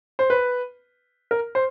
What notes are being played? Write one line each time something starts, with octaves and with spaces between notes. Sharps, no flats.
C5
B4
A#4
C5